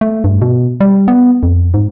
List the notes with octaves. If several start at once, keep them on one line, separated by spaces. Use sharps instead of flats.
A3
G2
B2
G3
B3
F2
G#2